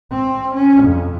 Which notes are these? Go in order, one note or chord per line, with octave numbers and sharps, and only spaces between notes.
C4
C#4
F2